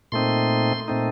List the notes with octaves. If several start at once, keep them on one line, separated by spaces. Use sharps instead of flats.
A#2 A3 C4 D#4 C6
A#2 A3 C4 D#4